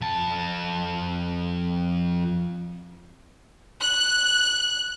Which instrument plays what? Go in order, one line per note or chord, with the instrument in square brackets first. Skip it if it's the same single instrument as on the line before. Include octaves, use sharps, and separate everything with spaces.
[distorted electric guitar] F2 A5
[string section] F#6